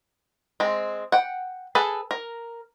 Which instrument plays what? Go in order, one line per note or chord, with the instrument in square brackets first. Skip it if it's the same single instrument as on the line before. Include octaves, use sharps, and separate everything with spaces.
[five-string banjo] G#3 C4
F#5 G5
G#4 A4 B4
A#4